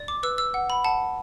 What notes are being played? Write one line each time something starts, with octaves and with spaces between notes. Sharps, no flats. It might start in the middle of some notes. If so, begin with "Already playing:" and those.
Already playing: D5
D6
B4 E6
E6
F#5
B5
F#5 A5